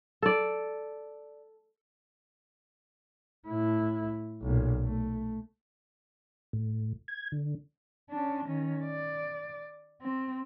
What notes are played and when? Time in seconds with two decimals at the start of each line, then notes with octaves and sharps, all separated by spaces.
0.22 A4 D5
3.47 A2 E4
4.42 B1 A#2
4.82 A3
6.53 A2
7.08 G#6
7.32 D3
8.11 C#4 D4
8.46 D#3 C#4
8.84 D5
10.02 C4